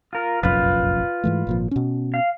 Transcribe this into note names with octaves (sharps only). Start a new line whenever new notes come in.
F4 A#4
F1 A#1 F#2 F4 B4
G#2 E3 A3
G#1 A#2 F3
B2 C#4
F5